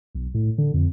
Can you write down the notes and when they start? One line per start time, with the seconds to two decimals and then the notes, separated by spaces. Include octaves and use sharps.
0.15 B1
0.34 A2
0.58 D3
0.74 F2